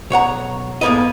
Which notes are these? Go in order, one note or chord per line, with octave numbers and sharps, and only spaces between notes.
B1 C#5 F#5 A#5
F2 G#2 A#3 B3 B4 D#5